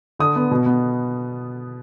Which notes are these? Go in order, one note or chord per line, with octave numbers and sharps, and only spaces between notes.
D3 D#6
B3
B2
B3